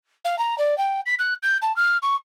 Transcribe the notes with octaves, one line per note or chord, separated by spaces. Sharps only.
F5
A#5
D5
G5
B6
F#6
G6
A5
F6
C#6